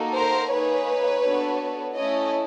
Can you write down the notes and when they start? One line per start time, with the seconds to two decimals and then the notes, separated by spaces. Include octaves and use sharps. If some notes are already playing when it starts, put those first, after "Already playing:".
Already playing: A#3 D#4 F#4 A4
0.14 A#4 C5
0.50 A#3 D#4 G#4 B4 C#5
1.22 B3 D4 F#4 A4
1.94 A3 C#4 E4 A4 C#5 D#5